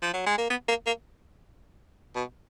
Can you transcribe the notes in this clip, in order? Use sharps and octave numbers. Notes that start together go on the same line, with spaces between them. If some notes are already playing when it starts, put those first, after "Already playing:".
F3
F#3
G#3
A#3
B3
A#3
A#3
B2